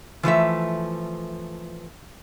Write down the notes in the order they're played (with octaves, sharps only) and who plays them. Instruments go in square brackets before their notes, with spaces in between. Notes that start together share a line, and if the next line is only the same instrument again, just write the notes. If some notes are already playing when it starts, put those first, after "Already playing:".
[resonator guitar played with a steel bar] E3 F3 A3 E5